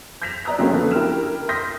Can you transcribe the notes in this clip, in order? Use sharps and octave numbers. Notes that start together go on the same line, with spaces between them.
G6 G#6 A#6 B6 E7 F7
D5 D#5 A#5 D#6 E6 F#6
C#3 F#3 A3 A#3 C4 C#4
D3 F3 A#3 B3 A4 F#6
E4 G4 A#4 F6 E7
C6 D#6 G6 A#6 B6